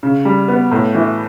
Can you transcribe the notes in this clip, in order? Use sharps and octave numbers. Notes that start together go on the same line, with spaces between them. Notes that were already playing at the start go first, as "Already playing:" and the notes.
C#3
G3
B3
A2
E3